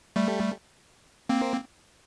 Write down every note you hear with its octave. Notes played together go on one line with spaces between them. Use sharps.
G3 A3
A#3 C4